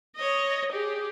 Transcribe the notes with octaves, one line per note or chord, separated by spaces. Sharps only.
C#5 D#5
G4 G#4